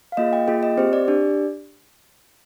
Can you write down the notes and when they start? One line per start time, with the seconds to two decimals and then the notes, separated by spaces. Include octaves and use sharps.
0.12 F5
0.17 A#3 F4 G#4 D#5
0.33 G5
0.48 A#3 F4 G#4 G5
0.63 D#5
0.77 C4 G4 C5
0.93 D5
1.08 D4 G4